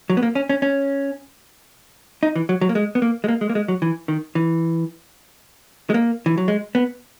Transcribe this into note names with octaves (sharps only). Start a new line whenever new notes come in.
F#3
B3
A#3
C#4
C#4
C#4
D#4
E3
F#3
F#3
A#3
G#3
B3
A#3
G#3
A#3
G#3
A#3
G#3
F#3
E3
D#3
E3
G#3
A#3
E3
F#3
G#3
B3